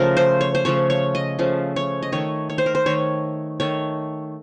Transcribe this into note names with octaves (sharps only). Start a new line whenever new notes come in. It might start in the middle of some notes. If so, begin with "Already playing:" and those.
Already playing: C#3 F3 A3 A#4
C5
C#5
C5
C#3 F3 A3 C#5
C#5
D#5
C#3 F3 A3
C#5
D#5
D#3 A3 C#5
C#5
C5
A#4
C5
D#3 A3 C#5
D#3 A3 C#5